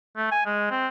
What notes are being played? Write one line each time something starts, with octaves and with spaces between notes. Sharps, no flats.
A3
G#5
G#3
C4